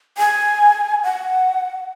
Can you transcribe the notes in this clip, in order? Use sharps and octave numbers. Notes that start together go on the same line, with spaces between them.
G#5
F#5